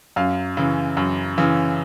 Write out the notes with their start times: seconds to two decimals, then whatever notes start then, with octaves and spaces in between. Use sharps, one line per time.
0.16 F#2 F5
0.57 C#3 E3
0.97 F#2
1.38 C#3 E3